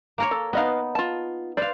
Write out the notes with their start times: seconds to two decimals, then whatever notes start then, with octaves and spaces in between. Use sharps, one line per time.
0.18 A#3 A#4 C#5
0.31 A4
0.53 B3 D#4 B4 D#5 F5
0.95 F4 A5
1.57 B4 C5 D5 F5